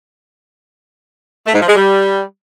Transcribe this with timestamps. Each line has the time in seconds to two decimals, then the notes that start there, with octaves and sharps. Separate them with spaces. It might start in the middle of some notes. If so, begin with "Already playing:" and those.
1.46 A3
1.54 G#2
1.61 F3
1.68 G#3
1.76 G3